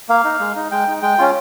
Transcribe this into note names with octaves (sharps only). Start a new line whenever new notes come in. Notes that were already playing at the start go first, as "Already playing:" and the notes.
A#3 F5
D#4
G#3
D#4
G#3 G5
D#4
G#3 G5
C#4 F4